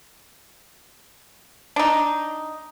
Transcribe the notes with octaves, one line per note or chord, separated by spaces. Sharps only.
D4 D#4